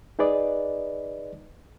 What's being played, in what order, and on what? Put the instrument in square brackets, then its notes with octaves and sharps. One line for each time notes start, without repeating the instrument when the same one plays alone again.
[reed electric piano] D#4 G#4 B4 D5 D#5